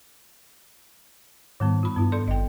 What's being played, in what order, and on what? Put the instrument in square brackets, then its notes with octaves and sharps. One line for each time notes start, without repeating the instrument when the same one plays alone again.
[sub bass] G#2 [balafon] D#3 G3 B3
[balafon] F4 B5
[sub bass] G2 [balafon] B3 E4
[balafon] A4 D5 C6
[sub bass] G#1 [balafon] D#5 G5